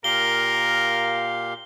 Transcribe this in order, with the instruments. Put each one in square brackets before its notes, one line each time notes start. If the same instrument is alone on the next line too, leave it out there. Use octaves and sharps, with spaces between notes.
[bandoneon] A#2 G4 F5 [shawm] A#4 [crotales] G7